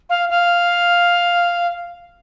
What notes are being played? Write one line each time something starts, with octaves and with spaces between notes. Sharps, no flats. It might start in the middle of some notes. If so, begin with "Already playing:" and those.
F5
F5